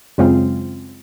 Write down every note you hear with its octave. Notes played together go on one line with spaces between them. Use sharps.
F#2 C#3 G#3 C4 F4